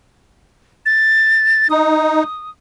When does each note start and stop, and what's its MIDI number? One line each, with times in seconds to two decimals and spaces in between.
0.86 1.68 93
1.70 2.23 63
1.70 2.50 87